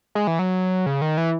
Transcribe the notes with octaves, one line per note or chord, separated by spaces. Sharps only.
G#3
E3
F#3
C#3
D#3
E3